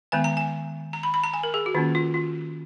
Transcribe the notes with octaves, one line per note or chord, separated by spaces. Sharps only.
D#3 G#3 B3 G#5
A#5
G#5
A#5
B5
B5
A#5
G#5
A#4
G#4
F#4
D#3 A#3 C#4 F4
F4
F4